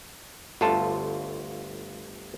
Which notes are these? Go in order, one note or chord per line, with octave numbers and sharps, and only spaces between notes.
G1 D2 F4 A4 A5